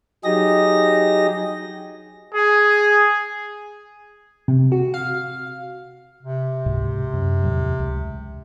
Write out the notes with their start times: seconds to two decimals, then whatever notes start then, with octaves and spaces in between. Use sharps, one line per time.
0.24 F#3 D#4 G4 G#4 D#5 A#6
2.34 G#4
4.48 C3
4.72 F#4
4.94 F5
6.23 C3
6.66 C#2 G#2 B2
7.13 F#2
7.43 E2 A2 F#3
7.79 C#2